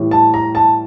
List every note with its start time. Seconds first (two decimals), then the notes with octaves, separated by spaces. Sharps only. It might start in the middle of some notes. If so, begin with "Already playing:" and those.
Already playing: A2 E3 G3
0.11 A5
0.34 A#5
0.55 A5